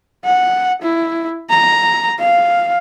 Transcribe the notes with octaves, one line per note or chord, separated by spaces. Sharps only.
F#5
E4
A#5
F5